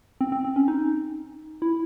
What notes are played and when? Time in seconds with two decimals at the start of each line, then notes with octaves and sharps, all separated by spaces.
0.21 C4
0.32 C4
0.45 C4
0.56 C#4
0.68 D#4
1.62 E4